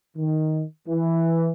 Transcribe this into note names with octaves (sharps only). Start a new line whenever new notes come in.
D#3
E3